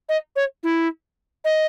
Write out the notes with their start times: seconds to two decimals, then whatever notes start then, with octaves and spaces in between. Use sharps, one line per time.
0.09 D#5
0.36 C#5
0.63 E4
1.44 D#5